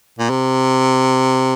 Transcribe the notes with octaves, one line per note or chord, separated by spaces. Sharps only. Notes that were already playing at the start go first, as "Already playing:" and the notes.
A#2
C3